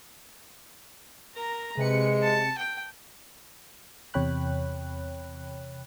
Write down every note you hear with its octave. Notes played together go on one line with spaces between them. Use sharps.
A#4 A#5
C3 G#3 B4 C#7
A5
G5
E2 C3 C#5 G5 B5 F#6